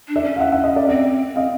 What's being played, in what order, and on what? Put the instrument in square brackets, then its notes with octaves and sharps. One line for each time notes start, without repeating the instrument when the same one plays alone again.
[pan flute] D4
[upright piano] D5 E5
[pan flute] C#4
[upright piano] F5
E5 F#5
E5 F#5
D#5 F5
D5 E5
[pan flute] C4 [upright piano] D5 E5
[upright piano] D#5 F5